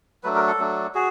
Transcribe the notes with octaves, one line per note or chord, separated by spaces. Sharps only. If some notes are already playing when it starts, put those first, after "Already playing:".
F#3 A3 D4 B4
A#4
A4
F#3 A3 D4
F#4 G#4